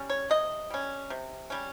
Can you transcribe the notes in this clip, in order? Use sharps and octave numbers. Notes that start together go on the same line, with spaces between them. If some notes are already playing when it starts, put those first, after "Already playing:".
Already playing: G3 C#4
C#5
C3 D#5
G3 C#4
C3
G3 C#4